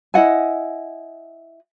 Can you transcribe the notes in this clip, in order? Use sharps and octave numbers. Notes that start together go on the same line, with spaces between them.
E4 D#5 F#5 G#5